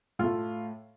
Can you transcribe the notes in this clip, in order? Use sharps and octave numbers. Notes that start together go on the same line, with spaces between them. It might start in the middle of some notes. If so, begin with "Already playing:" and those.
A2 A3 F4